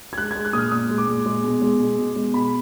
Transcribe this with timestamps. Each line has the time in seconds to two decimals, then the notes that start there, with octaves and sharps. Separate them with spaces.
0.13 G#6
0.18 G#3 F#6
0.31 G#3 G#6
0.45 F#6
0.53 A#2 D#6
0.58 F6
0.72 A#2 D#6
0.89 G#3
0.98 D6
1.08 A#2
1.26 G#3
1.43 B2
1.62 G#3
1.80 B2
1.98 B2
2.16 G#3
2.33 B2 B5